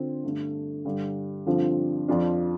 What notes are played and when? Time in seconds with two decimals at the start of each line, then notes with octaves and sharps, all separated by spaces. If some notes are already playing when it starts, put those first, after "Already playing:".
Already playing: D3 C4 F4
0.24 G2 D3 A3
0.85 G2 D3 G3
1.46 G2 D3 F3 C4 F4
2.08 F2 F3 D4 F4